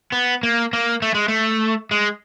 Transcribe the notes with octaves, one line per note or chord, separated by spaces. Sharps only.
B3
A#3
A#3
A3
G#3
A3
G#3